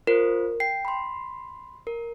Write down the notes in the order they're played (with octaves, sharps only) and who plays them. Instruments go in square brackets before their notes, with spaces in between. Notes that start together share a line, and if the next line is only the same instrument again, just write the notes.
[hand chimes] F4 C5 [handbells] A#4
[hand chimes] G5 [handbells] C7
[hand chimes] B5 C6
A#4